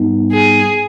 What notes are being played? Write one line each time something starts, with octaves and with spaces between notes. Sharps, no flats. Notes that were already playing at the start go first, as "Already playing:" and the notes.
Already playing: G#2 G3 B3 D#4
G#4